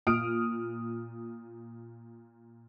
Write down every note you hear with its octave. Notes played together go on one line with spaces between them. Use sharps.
A#2 D#6 F6 D7